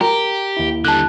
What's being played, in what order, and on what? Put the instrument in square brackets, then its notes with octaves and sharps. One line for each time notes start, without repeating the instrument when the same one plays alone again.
[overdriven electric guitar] G4 [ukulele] A#4
[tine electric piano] D#2 E4
[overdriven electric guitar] D3 G3 [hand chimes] A5 F#6